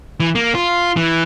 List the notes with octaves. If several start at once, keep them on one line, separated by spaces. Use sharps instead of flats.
E3
A#3
F4
E3